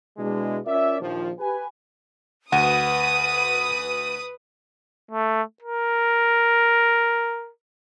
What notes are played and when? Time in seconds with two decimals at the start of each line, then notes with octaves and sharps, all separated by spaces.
0.17 B2 G#3 D4 E4
0.66 C#4 F4 A#4 D5 E5
1.00 A#1 D#2 F3
1.39 G4 B4 G#5
2.52 D2 F#4 B4 F#5 D#6 D#7
5.11 A3
5.62 A#4